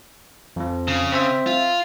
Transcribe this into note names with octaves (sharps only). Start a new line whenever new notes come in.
F2 F3
C#3
C4 C5 E5
F4